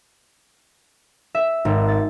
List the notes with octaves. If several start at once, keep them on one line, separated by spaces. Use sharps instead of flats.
E5
G#1
A6